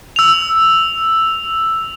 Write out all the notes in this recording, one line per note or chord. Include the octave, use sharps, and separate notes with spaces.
E6 F7